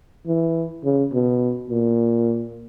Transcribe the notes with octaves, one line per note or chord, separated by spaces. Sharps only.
E3
C#3
B2
A#2